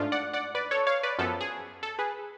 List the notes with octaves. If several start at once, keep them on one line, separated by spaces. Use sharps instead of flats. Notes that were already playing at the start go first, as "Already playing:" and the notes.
Already playing: G#2 F3 A3 D4 F4
D5 F#5
D5 F#5
B4 D5
A4 C#5
C#5 F5
B4 D5
F#2 F3 B3 A4
G#4
A4
G#4 B4